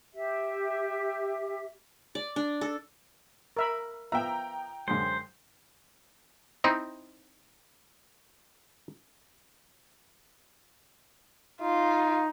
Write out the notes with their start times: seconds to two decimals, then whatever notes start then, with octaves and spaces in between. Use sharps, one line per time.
0.14 G4 E5
2.15 D5
2.36 D4
2.61 A4
3.57 A#4 E5 B5
4.12 F3 B3 E5 G5 A#5
4.88 F#2 D3 G#3 C5
6.64 C4 D#4 E4
11.61 D#4 F4